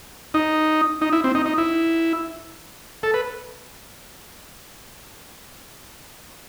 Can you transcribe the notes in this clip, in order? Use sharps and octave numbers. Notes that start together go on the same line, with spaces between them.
D#4
D#4
E4
C4
D#4
D#4
E4
A4
B4